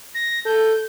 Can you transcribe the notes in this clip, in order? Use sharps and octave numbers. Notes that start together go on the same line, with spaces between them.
A#6
A4 G6